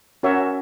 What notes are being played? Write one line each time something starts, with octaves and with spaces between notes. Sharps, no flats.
C#4 F#4 A#4 C#5 E5